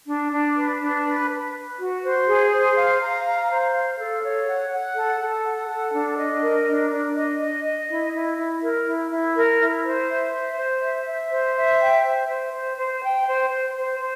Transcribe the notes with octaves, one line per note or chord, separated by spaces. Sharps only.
D4
D4
B4
D4
B4
B4
B4
F#4
C5
G#4
C5
F5
A#5
F5
C5
F5
A4
C#5
F#5
F#5
A4
A4
F#5
A4
D4
D#5
A#4
D4
D4
D#5
D#5
D#5
E4
E4
E4
A#4
E4
E4
A#4
E4
C5
E5
C5
C5
E5
E5
C5
E5
G5
C5
C5
C5
C5
G5
C5
C5
C5
C5